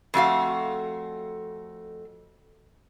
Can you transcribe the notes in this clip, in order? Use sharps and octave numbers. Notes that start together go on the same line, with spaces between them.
F2 A3 F#4 F5